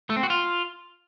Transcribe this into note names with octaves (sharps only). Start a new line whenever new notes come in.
A3
C4
F#4
F4